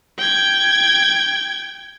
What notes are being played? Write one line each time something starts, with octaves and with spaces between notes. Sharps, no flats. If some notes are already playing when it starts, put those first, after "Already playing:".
G5 G#6